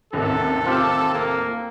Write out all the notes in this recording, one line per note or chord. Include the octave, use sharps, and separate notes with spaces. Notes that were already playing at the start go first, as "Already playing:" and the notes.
A1 D#2 C3 A4
C4 F4 G4
A#3